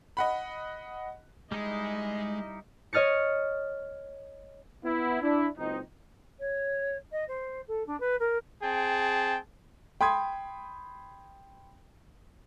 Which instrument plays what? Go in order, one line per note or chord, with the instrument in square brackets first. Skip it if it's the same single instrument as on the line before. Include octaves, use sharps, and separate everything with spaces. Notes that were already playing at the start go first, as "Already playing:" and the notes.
[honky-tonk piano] D#5 F#5 B5
[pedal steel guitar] G3 D#4 E4 [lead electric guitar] G#3 [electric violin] D#5
[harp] C#5 D#5 F6 A6 C#7
[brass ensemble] B3 E4
D4 E4
F#1 C#2 C4 D#4
[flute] C#5
D#5
C5
A4
D4
B4
A#4
[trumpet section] C4 G#4 G5 A5
[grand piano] G5 B5 C6 D#6 G#6